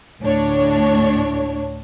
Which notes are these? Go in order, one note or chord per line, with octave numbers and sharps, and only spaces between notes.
D2 A2 D4 C#5